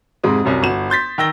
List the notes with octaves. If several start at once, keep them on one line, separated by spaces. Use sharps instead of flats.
F2 G#2 C3 G#3 D#6
C2 F#2 C3 F#3
G1 F#4 E7
C6 G6 A6 B6
D#3 G5 E6 A#6 G7